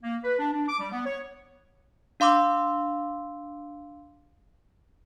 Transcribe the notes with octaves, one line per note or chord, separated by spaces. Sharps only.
A#3
B4
D4
D4
D6
G3
B3
C#5
D4 F5 C6 D6 E6